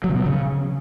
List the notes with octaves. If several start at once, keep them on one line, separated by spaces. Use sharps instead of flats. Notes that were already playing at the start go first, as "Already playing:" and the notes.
F#3
D3
B2
F#3
C#3